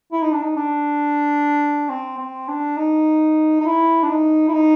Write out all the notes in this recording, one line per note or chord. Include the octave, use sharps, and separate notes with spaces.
E4
D#4
D4
D#4
D4
C4
C4
D4
D#4
D#4
E4
D4
D#4
E4
D#4